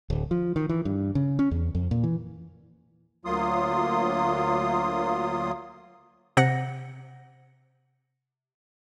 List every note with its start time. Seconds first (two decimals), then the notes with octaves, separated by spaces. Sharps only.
0.10 D1
0.31 F3
0.56 D#3
0.69 E3
0.85 G2
1.15 C#3
1.39 C#4
1.51 E2
1.75 F2
1.91 A#2
2.03 E3
3.25 D2 F#3 A#3 F4 C6 D#6
6.37 C3 F#5 A#6 C#7